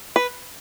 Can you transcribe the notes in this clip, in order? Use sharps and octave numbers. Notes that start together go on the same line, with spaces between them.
B4